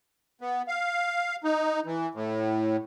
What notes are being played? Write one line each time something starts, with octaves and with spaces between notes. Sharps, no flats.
B3
F5
D#4
E3
A2